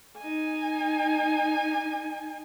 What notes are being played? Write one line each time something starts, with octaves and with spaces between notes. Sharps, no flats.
D#4 G#5